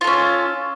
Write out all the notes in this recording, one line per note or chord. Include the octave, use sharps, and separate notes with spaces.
C#4 F4 A4